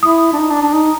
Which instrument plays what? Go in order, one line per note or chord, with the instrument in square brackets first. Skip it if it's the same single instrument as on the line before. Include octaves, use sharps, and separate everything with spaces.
[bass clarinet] E4 [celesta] D#6
[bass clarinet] D4
D#4
D4
D4
D#4